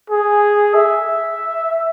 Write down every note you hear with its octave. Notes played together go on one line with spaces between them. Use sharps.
G#4
E5